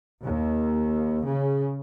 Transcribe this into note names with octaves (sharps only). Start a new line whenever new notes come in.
D#2
C#3